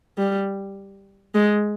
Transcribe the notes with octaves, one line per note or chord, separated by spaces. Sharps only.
G3
G#3